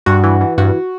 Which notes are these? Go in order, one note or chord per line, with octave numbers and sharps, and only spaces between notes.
G2 F#4
E3
E3
G2 F#4